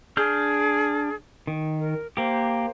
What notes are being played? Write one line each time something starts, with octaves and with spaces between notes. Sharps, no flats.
D4 G#4 F6 G6
D#3
A#4
A#3 G4 C5